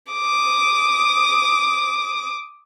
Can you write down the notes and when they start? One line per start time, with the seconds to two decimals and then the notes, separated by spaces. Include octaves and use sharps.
0.12 D6 D#6